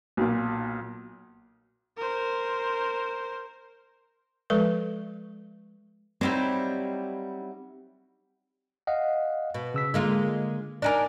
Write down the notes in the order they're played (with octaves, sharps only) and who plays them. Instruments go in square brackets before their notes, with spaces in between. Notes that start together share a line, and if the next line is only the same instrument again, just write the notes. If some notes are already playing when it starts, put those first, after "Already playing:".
[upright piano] B1 A#2
[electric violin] A#4 C5
[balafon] F3 G#3 A4 B4 C#6
[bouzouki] F#3 G3 E4 [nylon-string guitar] C4 D#4
[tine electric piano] D#5 F5 F#5
[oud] B2
[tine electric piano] C#3 E6 B6
[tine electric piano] D3 [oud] G#3 A#3 F4
[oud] D4 D#4 A#4 [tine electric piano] D5 G#5